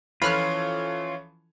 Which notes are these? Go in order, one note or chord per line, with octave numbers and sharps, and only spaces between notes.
E3 F3 C#4 F4 A4 B5 F6 F#6